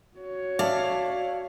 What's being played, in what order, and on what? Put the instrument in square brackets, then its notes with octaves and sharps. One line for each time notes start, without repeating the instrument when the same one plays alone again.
[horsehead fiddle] F#4 C#5
[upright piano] D5 E5 A5 [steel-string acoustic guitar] F5